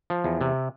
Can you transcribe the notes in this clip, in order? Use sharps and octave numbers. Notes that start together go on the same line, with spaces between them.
F3
E2
C3